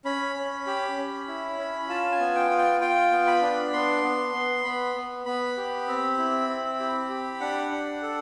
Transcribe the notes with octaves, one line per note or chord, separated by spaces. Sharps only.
C#4 B5
C#4
G4
C#4
E4
C#4
F4 A5
G#5
B3
G5
F4
G5
F4 G5
B3
B5
D4
B3 C6
B3
B3
B3 B5
B3
B3 B5
G4
C4
E4
C4
G4
G4
D4 F#5
D4
A4